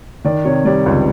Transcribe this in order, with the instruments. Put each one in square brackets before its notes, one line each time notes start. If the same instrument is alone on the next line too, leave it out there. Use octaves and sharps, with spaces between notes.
[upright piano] D#3 D5
C3 C#5
G3 D5
C#2